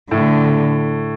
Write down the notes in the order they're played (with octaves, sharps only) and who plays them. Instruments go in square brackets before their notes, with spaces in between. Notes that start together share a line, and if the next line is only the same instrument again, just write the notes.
[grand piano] A2 [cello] D3